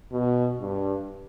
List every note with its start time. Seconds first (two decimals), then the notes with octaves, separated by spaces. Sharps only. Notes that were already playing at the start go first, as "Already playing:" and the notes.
0.12 B2
0.60 G2